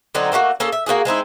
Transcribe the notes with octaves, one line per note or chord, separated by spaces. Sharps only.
D3 F#3 C4 D#4
A3 A#3 C4 F#4
A#3 C#4 G#4 A4
E5
A#3 C4 F#4 G#4
G#3 C4 D#4 E4